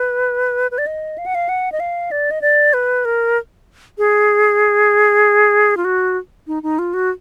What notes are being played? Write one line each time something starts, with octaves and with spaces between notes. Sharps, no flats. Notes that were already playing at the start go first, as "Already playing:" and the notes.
Already playing: B4
B4
D5
D#5
F5
F#5
F5
F#5
D#5
F5
D5
D#5
D5
B4
A#4
G#4
F4
F#4
D#4
D#4
F4
F#4